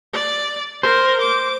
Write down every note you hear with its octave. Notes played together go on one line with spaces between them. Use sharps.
D5
A#4 C5
D6